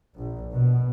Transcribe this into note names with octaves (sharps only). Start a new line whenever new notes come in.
A#1
B2